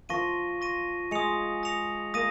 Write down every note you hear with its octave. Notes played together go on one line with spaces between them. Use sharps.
F3 C#6 A#6 D#7
C#6 A#6 D#7
G#3 D#6 A#6 C#7 F7
D#6 A#6 C#7 F7
A#3 D#6 A#6 D#7